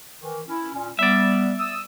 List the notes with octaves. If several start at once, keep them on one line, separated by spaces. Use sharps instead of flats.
D#3 E3
C#4 E4
A#2 C#4
G3 B3 D5 E5
D#6 E6